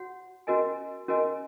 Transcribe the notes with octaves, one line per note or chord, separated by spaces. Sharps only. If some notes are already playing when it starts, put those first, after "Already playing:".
Already playing: F#4 C#5 F#5
C#4 F#4 A#4 D#5 G#5
C#4 F#4 A#4 D#5 G#5